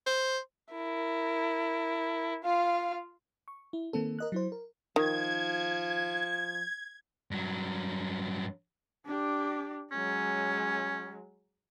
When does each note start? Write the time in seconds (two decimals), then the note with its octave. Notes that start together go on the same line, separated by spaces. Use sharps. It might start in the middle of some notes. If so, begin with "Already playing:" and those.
0.07 C5
0.72 E4 A#4
2.43 F4 F5
3.48 C#6
3.73 E4
3.93 D#3 A#3 C4 A4
4.19 A#4 D#5 F#6
4.32 F#3 E4 C5
4.52 A#4
4.96 D#3 F3 G#6
7.31 G2 F#3
9.06 D4 G4
9.92 F#3 G#3 C#4